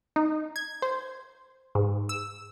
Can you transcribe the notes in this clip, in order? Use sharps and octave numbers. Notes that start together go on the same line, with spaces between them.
D#4
G#6
C5
G#2
E6